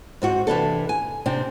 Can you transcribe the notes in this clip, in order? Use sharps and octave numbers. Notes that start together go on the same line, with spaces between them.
G#2 C4 F#4
C3 E3 D4 A4
G#5
C3 C4 D4